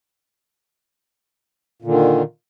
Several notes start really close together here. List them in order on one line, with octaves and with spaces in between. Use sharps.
A#2 D3 D#3